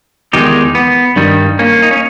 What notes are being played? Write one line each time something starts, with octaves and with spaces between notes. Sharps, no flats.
E2 D#3 G#3 D#4 G4
B3
G2 D#3 G3
A#3 C#4
D#4
C#4